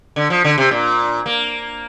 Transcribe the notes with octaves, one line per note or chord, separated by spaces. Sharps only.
D3
F3
D3
C3
A#2
A#3